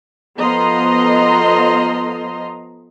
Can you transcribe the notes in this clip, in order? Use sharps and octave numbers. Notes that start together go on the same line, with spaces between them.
F3 B3 A4 D#5 A#5 C6